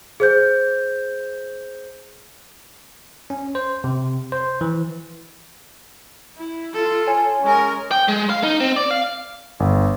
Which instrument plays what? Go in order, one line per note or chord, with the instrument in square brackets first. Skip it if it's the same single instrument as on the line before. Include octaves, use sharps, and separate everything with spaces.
[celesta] G#4 C5 G6
[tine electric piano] C#4
C5
C3
C5
E3
[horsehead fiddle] E4
F4 A4
[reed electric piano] C#5 G#5
[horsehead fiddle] G#3 A#4 [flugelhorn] C#4
[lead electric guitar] G5
G#3
F5
D#4
C4
D5
F5
[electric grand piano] G1